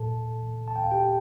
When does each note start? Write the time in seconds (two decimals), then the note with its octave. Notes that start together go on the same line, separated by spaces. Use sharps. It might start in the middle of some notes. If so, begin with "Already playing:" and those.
Already playing: A#2 A4 A5
0.68 A5
0.76 G5
0.84 F5
0.91 G4 G5